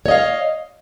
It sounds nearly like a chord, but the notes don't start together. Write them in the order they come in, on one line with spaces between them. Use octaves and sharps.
C#5 D#5 F5